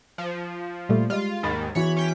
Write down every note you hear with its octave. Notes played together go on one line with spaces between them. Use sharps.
F3
A#2 G3 A3
G3 G#3 F4
D#2 G#2 D#3 B5 A6
E2 E3 F#4 C#5 B5
C#4 G5 B6